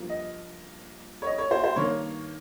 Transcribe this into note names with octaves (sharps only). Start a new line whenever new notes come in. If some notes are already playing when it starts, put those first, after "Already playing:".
Already playing: G2 F3 A#3
D#5
C#5
D#5
C#5
C5
C5
G2 D#3 A#3 C#5